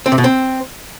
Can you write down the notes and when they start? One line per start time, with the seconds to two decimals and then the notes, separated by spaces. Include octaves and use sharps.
0.06 C4
0.12 C3
0.18 B2
0.24 C4